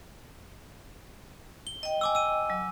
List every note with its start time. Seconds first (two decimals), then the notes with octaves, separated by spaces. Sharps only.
1.67 G7
1.83 D#5 G5
2.01 G#5 D6 E6
2.15 E6 D#7
2.50 F#3